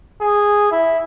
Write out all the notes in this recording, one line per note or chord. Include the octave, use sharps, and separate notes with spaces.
G#4
E4